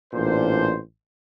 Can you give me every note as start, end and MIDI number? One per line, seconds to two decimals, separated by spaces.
0.13 0.78 33
0.13 0.78 46
0.13 0.78 62
0.13 0.78 72